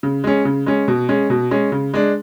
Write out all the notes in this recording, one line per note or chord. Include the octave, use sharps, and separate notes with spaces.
C#3
G#3 C#4
C#3
G#3 C#4
B2
G#3 C#4
B2
G#3 C#4
C#3
G#3 D4